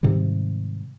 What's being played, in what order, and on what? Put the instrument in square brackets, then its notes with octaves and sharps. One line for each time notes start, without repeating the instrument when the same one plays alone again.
[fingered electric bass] G#2 C3 D#3 G3